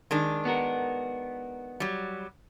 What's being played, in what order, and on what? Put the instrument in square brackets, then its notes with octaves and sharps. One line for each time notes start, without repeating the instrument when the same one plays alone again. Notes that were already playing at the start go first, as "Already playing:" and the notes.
[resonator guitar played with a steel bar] D#3 G#3 D4
[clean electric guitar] B3 F#4 A#4
[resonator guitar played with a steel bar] F#3 G3